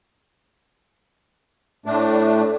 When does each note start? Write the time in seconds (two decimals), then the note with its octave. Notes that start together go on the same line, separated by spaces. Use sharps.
1.86 A2 A3 D4